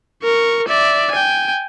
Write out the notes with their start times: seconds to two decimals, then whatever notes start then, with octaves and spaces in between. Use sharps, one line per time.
0.23 A#4 C#6
0.68 D5 E5
1.11 G5 G#5